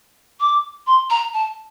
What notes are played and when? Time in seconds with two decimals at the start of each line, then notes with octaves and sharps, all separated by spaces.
0.40 D6
0.87 C6
1.10 A#5
1.33 A5